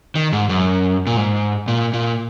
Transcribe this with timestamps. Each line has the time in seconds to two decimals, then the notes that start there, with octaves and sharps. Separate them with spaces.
0.15 D#3
0.33 G#2
0.49 F#2
1.07 A#2
1.17 G#2
1.68 A#2
1.93 A#2